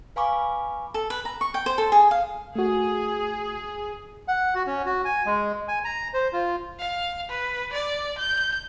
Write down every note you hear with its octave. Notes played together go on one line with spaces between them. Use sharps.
B4 F5 G#5 B5 C#6 D6
A4
B4
A#5
C#6
G5
C5
A4
G#4
F5
A3 F#4 G#4
F#5
F#4
C#4
F#4
G#5
G#3
G#5
A#5
C5
F4
F5
B4
D5
G6